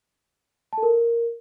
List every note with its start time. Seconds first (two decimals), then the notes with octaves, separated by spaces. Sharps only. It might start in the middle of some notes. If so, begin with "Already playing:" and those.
0.73 A5
0.78 A4
0.83 A#4